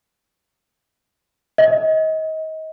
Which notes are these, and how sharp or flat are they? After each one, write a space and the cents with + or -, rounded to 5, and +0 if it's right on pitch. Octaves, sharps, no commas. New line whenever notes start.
D#5 +30